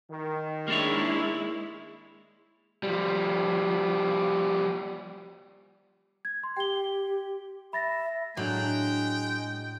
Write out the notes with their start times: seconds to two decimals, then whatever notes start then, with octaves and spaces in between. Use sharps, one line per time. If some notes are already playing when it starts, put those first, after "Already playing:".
0.10 D#3
0.68 G#3 A#3 D4 E4 C#5
2.83 F3 G3
6.25 G#6
6.44 C6
6.57 G4 G5 G7
7.73 E5 B5 A6 A#6
8.37 A2 F#3 G#3 D4 G5